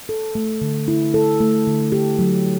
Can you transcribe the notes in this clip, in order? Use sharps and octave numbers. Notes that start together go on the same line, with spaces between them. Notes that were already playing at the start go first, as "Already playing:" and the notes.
A4
A3
D3
E4
A4
A3
D3
G4
F#3